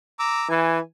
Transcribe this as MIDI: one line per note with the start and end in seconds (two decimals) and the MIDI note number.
0.19 0.48 82
0.19 0.48 86
0.19 0.48 88
0.49 0.79 52
0.49 0.79 80